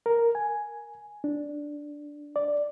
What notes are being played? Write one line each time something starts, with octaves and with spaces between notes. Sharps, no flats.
A#4
G#5
D4
D5